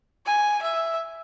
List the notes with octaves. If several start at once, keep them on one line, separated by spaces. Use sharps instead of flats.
G#5
E5